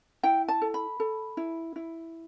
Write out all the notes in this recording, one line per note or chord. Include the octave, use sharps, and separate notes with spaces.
E4 G5
A5
A4
B5
A4
E4
E4